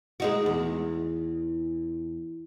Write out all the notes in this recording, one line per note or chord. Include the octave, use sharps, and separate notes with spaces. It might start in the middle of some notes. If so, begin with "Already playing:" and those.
G#3 D#4 F#4
E2